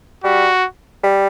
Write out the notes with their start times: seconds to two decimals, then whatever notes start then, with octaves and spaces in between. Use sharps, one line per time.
0.24 G3 F#4
1.03 G3